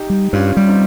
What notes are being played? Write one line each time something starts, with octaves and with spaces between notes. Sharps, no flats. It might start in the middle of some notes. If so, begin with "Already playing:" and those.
Already playing: D#4 G4
G3
G2 C#4 F4
G3
C4 D#4